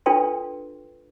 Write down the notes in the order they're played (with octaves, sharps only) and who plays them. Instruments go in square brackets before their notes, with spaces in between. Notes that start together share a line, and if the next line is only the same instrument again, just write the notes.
[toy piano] D4 F4 A4 B4 G5 C6